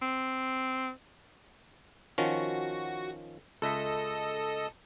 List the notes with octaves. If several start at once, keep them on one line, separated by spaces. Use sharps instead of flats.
C4
D#3 F3 C#4 F#4
C#2 A4 D#5 E5